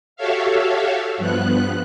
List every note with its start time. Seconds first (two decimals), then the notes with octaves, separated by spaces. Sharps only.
0.16 F#4 G4 A4 C#5 E5 F5
1.17 G2 F3 B3 F#6